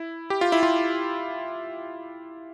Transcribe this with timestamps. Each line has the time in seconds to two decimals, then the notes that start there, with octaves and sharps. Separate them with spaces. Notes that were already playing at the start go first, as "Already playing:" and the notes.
Already playing: E4
0.30 G4
0.41 F4
0.52 E4
0.63 F4